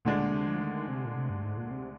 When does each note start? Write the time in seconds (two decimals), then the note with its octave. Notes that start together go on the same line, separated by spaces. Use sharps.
0.05 D2 A#2 D3 G#3 D4
0.19 A#2
0.33 C3
0.47 F3
0.60 D#3
0.88 C3
1.05 A#2
1.16 C3
1.30 G2
1.44 G#2
1.57 A#2
1.71 C3